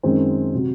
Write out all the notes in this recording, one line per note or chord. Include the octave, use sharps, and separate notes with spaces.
F#2 D#3 G#3 C4
C3 F#3